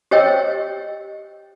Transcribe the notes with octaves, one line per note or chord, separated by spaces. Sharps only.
G4 C5 C#5 D#5 G5 E6